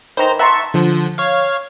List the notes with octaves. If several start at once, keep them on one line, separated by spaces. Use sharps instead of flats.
D#3 E3 C5 A#5
E5 F#5 A5 A#5 C6 C#6
D3 F3
C#5 F5